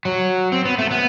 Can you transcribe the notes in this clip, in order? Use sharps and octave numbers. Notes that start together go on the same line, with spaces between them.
F#3
C4
B3
A3
B3